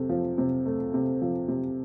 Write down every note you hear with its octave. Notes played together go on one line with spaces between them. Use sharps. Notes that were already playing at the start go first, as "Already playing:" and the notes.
Already playing: C3 A3
F3
C3
A3
C3
F3
C3